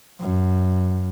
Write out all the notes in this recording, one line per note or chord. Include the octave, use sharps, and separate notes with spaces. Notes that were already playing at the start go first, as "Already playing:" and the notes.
F#2